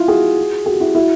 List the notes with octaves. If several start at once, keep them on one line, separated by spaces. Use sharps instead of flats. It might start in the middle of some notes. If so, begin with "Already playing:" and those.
Already playing: E4 F4
F#4 G#4
F#4 G#4
G4
E4 F#4
E4 F#4